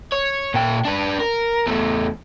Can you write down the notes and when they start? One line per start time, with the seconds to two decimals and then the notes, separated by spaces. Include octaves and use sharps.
0.12 C#5
0.54 A#2 G5
0.85 D4 B4
1.20 A#4
1.67 E2 A3